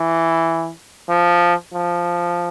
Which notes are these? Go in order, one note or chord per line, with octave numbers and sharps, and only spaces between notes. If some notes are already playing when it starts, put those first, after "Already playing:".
Already playing: E3
F3
F3